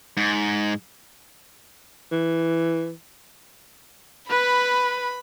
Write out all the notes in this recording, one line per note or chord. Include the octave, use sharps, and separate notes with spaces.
G#2
E3
B4 B5